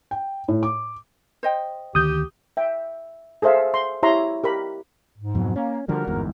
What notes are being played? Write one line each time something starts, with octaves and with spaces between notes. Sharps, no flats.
G5
A2
D6
C5 D#5 G5
D2 D#3 G4 D#6 G6
E5 G5
G#4 A4 C5 E5 F5
C6
E4 G4 C#5 E5 A#5 C6
G4 A#4 B5
G#2
F2 B2 F#3
A#3 C#4
D3 F3 G3 A#3 F#4 A#4
G1 E2 G#2